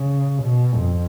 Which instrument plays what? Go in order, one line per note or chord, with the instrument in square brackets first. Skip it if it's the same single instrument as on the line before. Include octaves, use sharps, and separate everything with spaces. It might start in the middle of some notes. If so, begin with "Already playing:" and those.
Already playing: [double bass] C#3
B2
F2